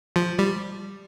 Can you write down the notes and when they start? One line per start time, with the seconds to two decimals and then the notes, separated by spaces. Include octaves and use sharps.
0.16 F3
0.39 G3